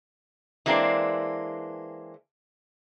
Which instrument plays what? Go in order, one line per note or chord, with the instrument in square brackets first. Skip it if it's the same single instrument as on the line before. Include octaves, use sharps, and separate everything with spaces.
[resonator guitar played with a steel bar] E3 G#3 A#3 C4 D4